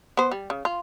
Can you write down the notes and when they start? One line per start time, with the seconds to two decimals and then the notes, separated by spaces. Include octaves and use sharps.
0.17 B3 C5
0.31 G3
0.50 C#3
0.65 F4